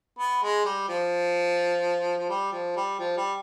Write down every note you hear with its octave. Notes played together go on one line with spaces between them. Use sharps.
B3
G#3
G3
F3
F3
G3
F3
G3
F3
G3